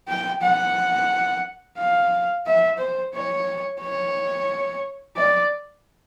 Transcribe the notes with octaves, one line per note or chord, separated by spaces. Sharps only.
G5
F#5
F5
E5
C5
C#5
C#5
D5